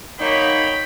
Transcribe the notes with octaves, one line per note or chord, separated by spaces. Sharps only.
F#3 A#3 D#4 C#5 G5 B5